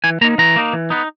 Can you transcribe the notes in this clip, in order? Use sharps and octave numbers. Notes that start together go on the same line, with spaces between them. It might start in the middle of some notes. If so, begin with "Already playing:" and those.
E3 G#5
A#3 D#4 A#5
E3 A#5
A#3 D#4
E3
B3 D#4